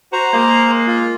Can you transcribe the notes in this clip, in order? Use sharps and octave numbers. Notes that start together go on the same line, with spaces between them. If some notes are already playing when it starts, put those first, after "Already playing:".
F#4 C5 A#5
G#3 A#3
F4